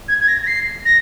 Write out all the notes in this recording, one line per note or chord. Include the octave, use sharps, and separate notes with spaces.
G#6
G#6
A#6
A#6
C7
A#6